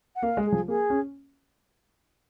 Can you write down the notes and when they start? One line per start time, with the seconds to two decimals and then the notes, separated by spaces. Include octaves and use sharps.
0.15 F#5
0.22 A#3 F5
0.37 G#3
0.45 G#4
0.52 F3
0.68 A#3 G#4
0.90 C#4